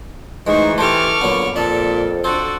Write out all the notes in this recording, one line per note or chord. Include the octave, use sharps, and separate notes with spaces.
D2 E3 G#3 D#4 C5 C#6
G4 A4 C5 A5 C#6 D6 F6
A#2 D3 F#3 B3
F2 A#2 D4 A4
D4 F#4 A4 C5